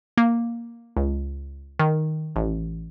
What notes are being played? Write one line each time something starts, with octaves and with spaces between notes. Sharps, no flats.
A#3
C#2
D#3
A1